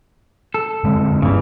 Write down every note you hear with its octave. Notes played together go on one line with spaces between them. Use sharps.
A4
D3 G#3 C4
G2 C#3 E3 B3